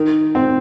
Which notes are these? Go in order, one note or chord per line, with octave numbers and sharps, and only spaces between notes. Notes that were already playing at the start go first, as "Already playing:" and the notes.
Already playing: D#3
C4